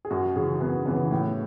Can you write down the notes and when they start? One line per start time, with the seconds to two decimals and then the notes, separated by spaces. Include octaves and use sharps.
0.05 G#4
0.10 F#2 F#4
0.36 C#3 E3 G#4
0.61 F#2 B3
0.86 C#3 E3 B3
1.11 A2